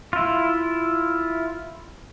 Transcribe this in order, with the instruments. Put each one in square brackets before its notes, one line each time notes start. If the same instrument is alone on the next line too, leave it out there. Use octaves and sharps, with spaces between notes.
[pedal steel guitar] E4 F4